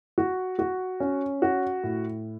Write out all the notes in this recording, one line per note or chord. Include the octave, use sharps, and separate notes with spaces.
F#4
F#4
C#4
F#4
A2